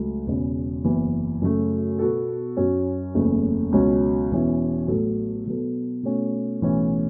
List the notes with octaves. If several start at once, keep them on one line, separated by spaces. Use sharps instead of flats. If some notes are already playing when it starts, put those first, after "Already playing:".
Already playing: C#2 F#3 A3
E1 E2 C#3
F#1 E2 E3
F#2 C#3 F#3 A3
B2 B3 F#4 A4
F#2 F#3 C#4
F#1 E2 C#3 A3
C#2 B2 F#3 C#4
E1 E2 E3 C#4 E4
A1 A2 F#3 B3 A4
B2 F#3 B3 A4
B2 A3 C#4
B1 A2 E3 A3 C#4